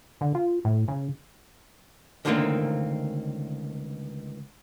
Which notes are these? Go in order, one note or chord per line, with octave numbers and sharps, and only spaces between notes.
D3
F4
A2
C#3
C#2 D3 D#3 A3 A#3 C4